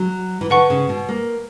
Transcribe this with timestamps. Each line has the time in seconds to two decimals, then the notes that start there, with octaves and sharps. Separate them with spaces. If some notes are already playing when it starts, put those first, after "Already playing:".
Already playing: F#3
0.41 E3
0.50 D3 B4 F#5 C#6
0.70 C#3
0.89 B2
1.09 A#3